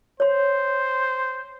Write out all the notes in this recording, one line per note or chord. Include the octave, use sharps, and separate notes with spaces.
C5 C#5 C6